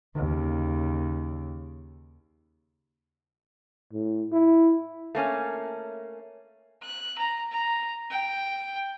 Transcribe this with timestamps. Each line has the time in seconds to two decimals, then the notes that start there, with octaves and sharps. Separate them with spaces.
0.15 D#2 C#3
3.93 A2
4.32 E4
5.15 A3 A#3 C#4
6.82 F#6
7.18 A#5
7.52 A#5
8.11 G5